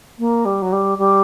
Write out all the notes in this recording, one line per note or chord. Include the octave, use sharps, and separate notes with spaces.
A#3
G3
F#3
G3
G3